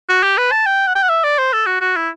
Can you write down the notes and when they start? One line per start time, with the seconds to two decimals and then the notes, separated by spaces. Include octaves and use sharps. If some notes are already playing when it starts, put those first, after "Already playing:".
0.09 F#4
0.23 G4
0.38 B4
0.52 A5
0.66 G5
0.87 F#5
0.95 G5
1.03 F#5
1.09 E5
1.24 D5
1.38 C5
1.53 A4
1.67 F#4
1.81 F#4
1.96 E4